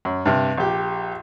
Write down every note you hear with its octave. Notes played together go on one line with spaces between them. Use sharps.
F#2
G2 C3
A#1 G4